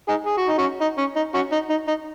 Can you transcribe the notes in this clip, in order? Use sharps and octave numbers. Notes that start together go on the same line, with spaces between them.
D#4 G#4
G#4
F#4
D#4
C#4 F#4
D#4
C#4
D#4
C#4 F#4
D#4
D#4
D#4